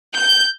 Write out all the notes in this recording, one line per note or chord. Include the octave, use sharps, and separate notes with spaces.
G6